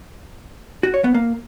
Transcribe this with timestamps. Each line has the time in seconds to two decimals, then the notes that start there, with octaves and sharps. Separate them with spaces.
0.83 F#4
0.94 C#5
1.04 B3
1.14 A#3